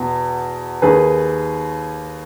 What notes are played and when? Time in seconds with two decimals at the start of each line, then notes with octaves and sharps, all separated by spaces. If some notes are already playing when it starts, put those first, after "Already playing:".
Already playing: E2 B2
0.82 D#2 D#3 G#4 B4